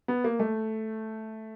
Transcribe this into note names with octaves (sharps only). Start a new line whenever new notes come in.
B3
A#3
A3